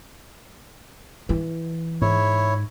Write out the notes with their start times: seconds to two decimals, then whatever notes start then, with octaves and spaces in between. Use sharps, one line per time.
1.29 E3
2.02 G#2 E4 C#5